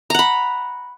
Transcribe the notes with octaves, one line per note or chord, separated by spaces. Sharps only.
F#5 A#5 B5